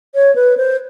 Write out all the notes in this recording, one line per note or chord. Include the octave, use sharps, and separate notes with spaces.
C#5
B4
C5